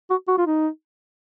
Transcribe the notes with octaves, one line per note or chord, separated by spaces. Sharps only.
F#4
F#4
F4
D#4